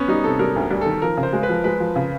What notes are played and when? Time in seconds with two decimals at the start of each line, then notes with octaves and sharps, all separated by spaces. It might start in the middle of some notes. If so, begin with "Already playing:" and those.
Already playing: B3 C#4
0.08 G3 D#4
0.24 C3 A4
0.39 G3 A#4
0.56 D2
0.70 G3
0.81 D#3 A4
1.02 F3 A#4
1.17 C#3
1.23 C5
1.33 G#3
1.43 B4
1.49 F3
1.64 G#3 B4
1.80 F3
1.96 C#3